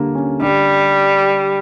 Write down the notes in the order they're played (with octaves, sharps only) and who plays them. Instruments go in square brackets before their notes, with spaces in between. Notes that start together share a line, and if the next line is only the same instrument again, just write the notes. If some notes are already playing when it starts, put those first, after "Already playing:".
Already playing: [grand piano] D3 G3 A#3
C#4
[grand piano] D3 [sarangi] G3